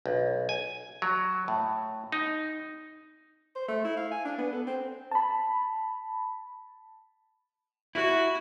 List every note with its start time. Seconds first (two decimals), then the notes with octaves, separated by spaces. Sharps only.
0.06 B1
0.49 G#5
1.02 F#3
1.48 A2
2.12 D#4
3.56 C5
3.68 A3
3.85 E4
3.97 F5
4.11 G#5
4.25 D4
4.38 B3
4.52 A4
4.67 C4
5.11 A5 B5
7.95 E4 F#4